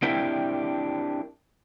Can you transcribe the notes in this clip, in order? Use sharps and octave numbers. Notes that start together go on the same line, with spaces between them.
C4 D4 E4 G4 A#4 E5